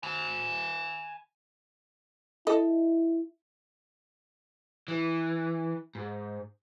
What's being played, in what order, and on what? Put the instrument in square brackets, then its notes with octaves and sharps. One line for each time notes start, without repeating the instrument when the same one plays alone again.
[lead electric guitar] G#5 B5
[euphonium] E4 [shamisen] A4 D#5
[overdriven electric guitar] E3
G#2